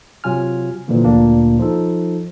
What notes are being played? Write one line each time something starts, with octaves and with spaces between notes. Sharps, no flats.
C3 F#3 F4 G#5 F6
A#2 D3 E3 F3 A#3
D2 A#2 A#3 D4
F3 D#4 A4